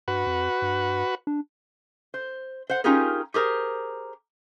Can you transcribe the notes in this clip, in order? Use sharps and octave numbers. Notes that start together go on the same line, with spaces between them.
G2 F#4 B4
F2
G2
D4
C5
C5 F#5
C#4 D#4 F4 G4 G#4 A#4
G4 G#4 A#4 C5